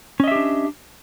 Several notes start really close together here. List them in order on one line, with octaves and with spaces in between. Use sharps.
C#4 D#5 E5 G4 D4